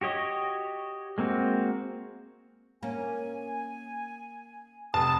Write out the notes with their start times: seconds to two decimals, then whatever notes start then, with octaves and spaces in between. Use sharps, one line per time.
0.01 F#4 G4 C#5 D#5
1.18 G#3 A#3 C4 F#4
2.83 A#3 C#4 G#5
4.94 F1 A5 D#6